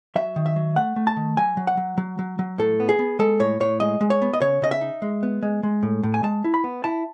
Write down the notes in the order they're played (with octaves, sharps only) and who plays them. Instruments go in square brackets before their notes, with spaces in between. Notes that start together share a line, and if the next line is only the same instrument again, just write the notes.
[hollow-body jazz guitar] F#3 E5
D#3
E5
F#3
A3 F#5
A3
A5
D#3
F#3 G#5
F#3
F#5
F#3
F#3
F#3
F#3
A2 A4
B3
G#4
B3
G#3 A4
A2 C#5
A2 C#5
G#3 D#5
G#3
C#5
B3
D#5
C#3 C#5
C#3 D#5
E5
D#4
G#3
B3
G#3
G#3
A2
A2
G#5
G#3 A5
E4
B5
B3
E4 A5